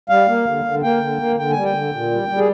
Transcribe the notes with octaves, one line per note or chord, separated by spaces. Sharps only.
G3 F5
A#3
D3
D3
A#3 G5
D3
A#3
D3 G5
G#5
G3
G5
D3
A#2
G3
G3
G#4